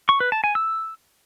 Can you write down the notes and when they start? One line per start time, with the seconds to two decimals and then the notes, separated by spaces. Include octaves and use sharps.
0.09 C#6
0.20 B4
0.32 A5
0.44 G#5
0.55 E6